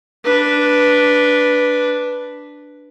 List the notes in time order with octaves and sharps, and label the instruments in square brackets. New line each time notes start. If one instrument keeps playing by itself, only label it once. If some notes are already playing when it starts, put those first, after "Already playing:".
[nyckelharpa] D4 B4